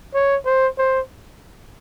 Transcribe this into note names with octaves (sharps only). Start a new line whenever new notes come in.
C#5
C5
C5